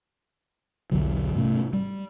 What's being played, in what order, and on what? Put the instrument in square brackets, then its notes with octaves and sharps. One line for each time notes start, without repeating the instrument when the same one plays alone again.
[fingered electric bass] B1 E2 D3 F#3
G#2 C3 A3 C#4
G3